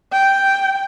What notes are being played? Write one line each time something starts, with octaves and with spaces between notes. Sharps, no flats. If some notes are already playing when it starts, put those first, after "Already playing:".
G5